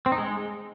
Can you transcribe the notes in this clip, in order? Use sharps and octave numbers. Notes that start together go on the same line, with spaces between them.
C4
D#4
G#3